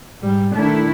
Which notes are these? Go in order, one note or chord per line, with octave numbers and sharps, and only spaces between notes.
G#2 G3
D#3 A3 D4 E4